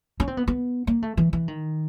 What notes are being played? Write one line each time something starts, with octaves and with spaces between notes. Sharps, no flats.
C#4
C4
B3
B3
A#3
A3
E3
E3
D#3